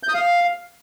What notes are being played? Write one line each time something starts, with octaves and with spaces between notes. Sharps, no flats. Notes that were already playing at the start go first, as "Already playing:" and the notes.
G6
D#6
F5